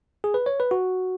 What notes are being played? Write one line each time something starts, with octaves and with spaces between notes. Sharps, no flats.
G#4
B4
C#5
B4
F#4